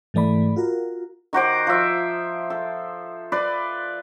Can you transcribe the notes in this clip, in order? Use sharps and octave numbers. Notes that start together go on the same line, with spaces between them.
G#2 E3 A3 D5 B5
F4 F#4 A#4
D#3 F#4 C5 D6
F3 E5
A4
B4 D5 C6